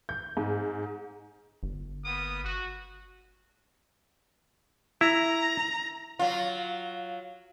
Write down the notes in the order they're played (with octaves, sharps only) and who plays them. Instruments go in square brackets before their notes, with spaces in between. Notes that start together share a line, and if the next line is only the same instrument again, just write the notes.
[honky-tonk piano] G6
G#2
[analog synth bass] G1
[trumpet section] A#3 B3 D#6
F#4
[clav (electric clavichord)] E4 [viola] A#5
[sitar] F#3 F4